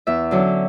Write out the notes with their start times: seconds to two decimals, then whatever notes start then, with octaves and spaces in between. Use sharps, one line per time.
0.07 E2 E5
0.31 D3 F#3 C#4